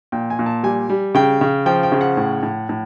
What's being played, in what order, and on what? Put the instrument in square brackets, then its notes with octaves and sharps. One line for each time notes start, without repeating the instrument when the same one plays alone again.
[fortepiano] A#2 G5
G#5
A#2
A5
G3 G#5
G3
C#3 G5
C#3
F3 G5
G5
C#3
F#5
A2
A2
A2